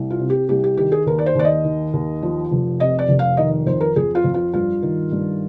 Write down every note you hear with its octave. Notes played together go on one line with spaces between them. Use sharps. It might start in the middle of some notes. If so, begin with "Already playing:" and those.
Already playing: C2
F4
C3
G4
C2 G4
G4
D#3 G4
G#4
D#2 A#4
D5
C5
D#2 D5
D#5
D#3
D#2
F3
F1
C3 D#5
D5
F1
F5
D#3 D#5
F2 C5
A#4
F2 G#4
F4
F2
F4
G2 F4
D#3
G2